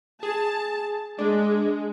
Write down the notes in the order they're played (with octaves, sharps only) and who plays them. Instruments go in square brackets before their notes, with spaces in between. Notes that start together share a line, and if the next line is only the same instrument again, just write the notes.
[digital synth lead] G#4 [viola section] A5
[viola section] G#3 [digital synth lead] D4